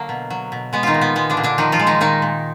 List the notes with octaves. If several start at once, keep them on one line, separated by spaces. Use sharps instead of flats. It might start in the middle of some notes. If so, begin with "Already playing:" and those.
Already playing: D3 F#3 A#3
B2
F#3
B2
G#3 B3
D#3 D#4 F4
A#2
B3
G#3 B3
D3 D4
A#2
D3 D4
D#3 F3 D#4
F3 F4
G#3
D#3 D#4
A#2 D#3 D#4
A#2